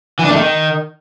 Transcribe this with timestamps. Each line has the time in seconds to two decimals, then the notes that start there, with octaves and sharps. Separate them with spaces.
0.19 E3
0.25 D4
0.30 A3
0.36 D#3